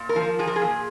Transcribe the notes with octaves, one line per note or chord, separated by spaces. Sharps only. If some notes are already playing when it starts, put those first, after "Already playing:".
Already playing: A#2
A#4
F3
F3 G#4
A#4
G#4
A#2